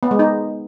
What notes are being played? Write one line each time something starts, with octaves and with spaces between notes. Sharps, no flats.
B3
G#3
D#4